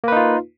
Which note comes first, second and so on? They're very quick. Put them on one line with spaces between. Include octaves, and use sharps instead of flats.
A#3 B4 D#4 F4